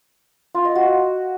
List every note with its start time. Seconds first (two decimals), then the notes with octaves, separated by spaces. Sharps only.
0.55 F4
0.65 D#5
0.75 F#4